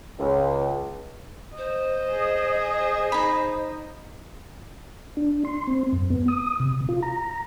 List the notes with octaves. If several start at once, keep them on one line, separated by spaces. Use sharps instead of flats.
C#2
C5 D#5
G#4
D#4 B5
D4
C6
C4
F#2
B3
D#6
C3
F4
A#5